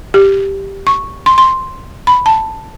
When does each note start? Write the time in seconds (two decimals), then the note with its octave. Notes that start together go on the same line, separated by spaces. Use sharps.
0.14 G4
0.87 C#6
1.26 C6
1.38 C6
2.07 B5
2.26 A5